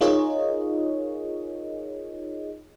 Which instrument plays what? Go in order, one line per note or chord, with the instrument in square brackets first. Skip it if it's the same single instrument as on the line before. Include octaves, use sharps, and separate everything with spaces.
[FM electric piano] D#4 F4 G#4 A#4 C#5 D#5